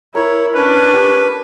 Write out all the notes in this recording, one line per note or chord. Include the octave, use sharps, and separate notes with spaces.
E4 A#4 C#5
C#4 D4 B4
G4